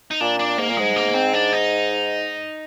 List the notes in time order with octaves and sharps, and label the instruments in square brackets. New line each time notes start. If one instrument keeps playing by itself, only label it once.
[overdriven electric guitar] D#4
[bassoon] A#2 [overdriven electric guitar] D4
[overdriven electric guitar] D4
[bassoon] G#2 [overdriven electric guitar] A#3
[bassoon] A#2
[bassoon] G#2 [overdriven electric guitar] G#3
[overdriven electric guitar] A#3
C4
D4
D#4